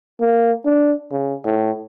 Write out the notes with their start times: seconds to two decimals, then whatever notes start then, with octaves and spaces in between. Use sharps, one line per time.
0.20 A#3
0.65 D4
1.11 C#3
1.45 A2